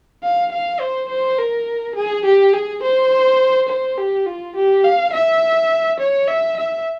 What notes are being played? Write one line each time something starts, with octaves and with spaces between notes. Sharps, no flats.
F5
F5
C5
C5
A#4
G#4
G4
G#4
C5
C5
G4
F4
G4
F5
E5
C#5
E5
E5